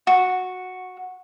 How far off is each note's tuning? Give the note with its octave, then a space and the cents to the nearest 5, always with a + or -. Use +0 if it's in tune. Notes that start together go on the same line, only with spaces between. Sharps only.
F#4 -10